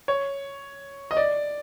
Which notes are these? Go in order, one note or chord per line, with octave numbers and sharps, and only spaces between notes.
C#5
D#5
D5